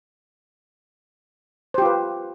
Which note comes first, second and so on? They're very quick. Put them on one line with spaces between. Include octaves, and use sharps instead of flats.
C5 G4 F4 B4